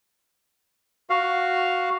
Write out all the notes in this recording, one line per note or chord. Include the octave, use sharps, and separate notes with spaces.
F#4 F5